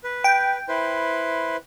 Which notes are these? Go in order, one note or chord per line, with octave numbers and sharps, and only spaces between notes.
B4
G5
E4 B4 C5